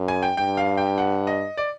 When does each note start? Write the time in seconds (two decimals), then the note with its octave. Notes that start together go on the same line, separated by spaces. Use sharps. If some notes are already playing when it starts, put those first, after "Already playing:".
Already playing: F#2
0.08 G#5
0.23 G5
0.37 G2 G5
0.57 F5
0.77 G5
0.98 F#5
1.27 D#5
1.57 D5